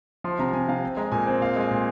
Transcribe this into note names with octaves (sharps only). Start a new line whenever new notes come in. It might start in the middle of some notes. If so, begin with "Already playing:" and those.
F3 C6
C3 A#5
C3 G#5
C3 F5
C4
G#3 A#5
A#2 G#5
C4 G#5
A#2 F5
G#3 G#5
A#2